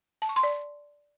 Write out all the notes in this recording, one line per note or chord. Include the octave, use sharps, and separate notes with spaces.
A5
C#6
C6
D5